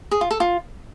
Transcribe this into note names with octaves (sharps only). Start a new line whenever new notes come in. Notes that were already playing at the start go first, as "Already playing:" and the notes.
G#4
F4
A4
F4